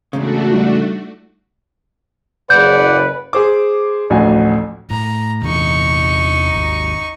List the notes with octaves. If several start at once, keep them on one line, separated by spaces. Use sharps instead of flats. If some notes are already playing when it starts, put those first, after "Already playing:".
E2 G#2 C#3 A3 D4 F#4
G3 D#4 F4
F#1 C#3 B4 D5 F#5 G6
G#4 C5 D6
A1 D2 F3 F#4 G#5
A2 A#5
E2 C3 E3 D#4 C#6
G#1 D#2